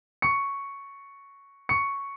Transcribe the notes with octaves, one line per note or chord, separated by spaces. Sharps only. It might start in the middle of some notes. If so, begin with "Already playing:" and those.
C#6 C#7
C#6 C#7